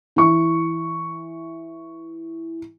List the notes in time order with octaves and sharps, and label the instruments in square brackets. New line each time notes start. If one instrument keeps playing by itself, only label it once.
[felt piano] E3 C#6